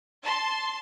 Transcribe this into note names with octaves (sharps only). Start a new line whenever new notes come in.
A5 C6